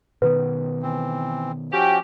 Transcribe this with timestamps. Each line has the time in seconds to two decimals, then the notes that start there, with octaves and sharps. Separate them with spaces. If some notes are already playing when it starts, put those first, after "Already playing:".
0.22 B2 D#3 B3 B4
0.82 E3 C4
1.72 F3 C#4 F#4 G4